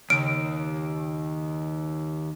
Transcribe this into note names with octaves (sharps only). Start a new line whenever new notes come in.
D#2 C#3 D7